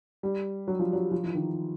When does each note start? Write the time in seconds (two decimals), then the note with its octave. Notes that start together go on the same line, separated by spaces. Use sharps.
0.23 G3
0.68 F#3
0.79 F3
0.93 F#3
1.11 F3
1.24 E3
1.35 D#3